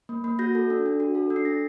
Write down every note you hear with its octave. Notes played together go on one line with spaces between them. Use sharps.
A#3
A#3
F#4 G6 A#6
A4
D4
D4
F#4
A4
D4
C7
D4 A#6
A6